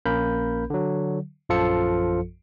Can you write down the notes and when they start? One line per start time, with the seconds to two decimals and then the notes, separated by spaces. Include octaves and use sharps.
0.06 A#1 A#3 C#4 A#4 B5 G6
0.70 D3 F#3
1.49 A#1 F#2 F3 F4 A4 C#7